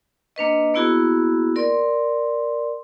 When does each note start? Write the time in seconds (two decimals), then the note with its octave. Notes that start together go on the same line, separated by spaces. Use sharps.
0.36 A#3 D4 B4 D#5
0.74 A#3 B3 E4 F#4 G#4
1.56 A#4 D5 C6